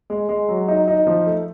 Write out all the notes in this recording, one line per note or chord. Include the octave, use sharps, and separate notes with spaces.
G#3
G#3
F#3
D#4
D#4
F3
A3